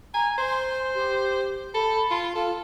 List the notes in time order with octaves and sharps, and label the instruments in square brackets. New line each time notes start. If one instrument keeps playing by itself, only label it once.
[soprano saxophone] G#5 [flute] A#5
[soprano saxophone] C5 [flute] C6
[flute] G4
[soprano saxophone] A4 [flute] B5
[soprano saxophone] F4 [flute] C6
[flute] F4 [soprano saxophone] A4